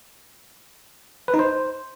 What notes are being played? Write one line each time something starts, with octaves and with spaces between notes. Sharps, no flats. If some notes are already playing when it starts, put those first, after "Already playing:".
B4
D#4
C5